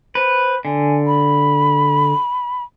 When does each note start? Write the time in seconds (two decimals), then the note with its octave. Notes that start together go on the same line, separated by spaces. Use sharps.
0.15 B4 C5
0.65 D3 G#5
1.07 B5